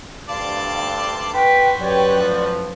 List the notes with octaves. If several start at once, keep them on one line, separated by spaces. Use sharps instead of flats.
D2 G2 D5 F5 A5 C6
F#4 B4 C5 G5
F#2 G4 B4 C#5 D5 G5
A2 F3